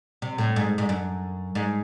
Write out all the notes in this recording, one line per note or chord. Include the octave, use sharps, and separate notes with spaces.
C3
A2
G#2
G#2
F#2
G#2